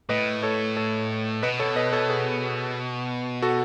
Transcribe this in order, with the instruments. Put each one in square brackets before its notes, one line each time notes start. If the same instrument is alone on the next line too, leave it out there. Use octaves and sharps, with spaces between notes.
[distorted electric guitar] A2 [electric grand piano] B4 D#5
[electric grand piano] A4 C#5
A4 C#5
[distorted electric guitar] B2 [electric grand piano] B4 D#5
[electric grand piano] A4 C#5
B4 D#5
A4 C#5
G#4 B4
F#4 A4